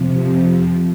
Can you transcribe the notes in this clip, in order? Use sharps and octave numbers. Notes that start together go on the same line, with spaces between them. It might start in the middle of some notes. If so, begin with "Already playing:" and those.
Already playing: F2 C3 F3